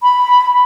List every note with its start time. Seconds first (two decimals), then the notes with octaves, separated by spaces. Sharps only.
0.03 B5